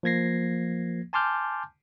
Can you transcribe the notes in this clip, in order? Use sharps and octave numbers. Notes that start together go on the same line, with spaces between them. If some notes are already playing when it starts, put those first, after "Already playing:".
F3 A#3 G#6 A#6 C7
G#5 A5 C6 D6 F6 G6